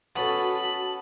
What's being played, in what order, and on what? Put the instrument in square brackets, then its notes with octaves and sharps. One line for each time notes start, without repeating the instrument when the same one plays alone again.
[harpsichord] B3 C#4 A4 [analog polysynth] F#4 A5 [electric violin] B5